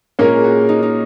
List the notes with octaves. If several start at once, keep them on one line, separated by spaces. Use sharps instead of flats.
A#2 G#3 A#3 C#4 A#4 C#5
F#4
D#4
D#4